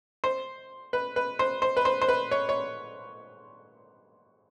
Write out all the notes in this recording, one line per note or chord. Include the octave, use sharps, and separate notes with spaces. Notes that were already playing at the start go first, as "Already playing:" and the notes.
C5
B4
B4
C5
C5
B4
C5
C5
B4
C#5
C#5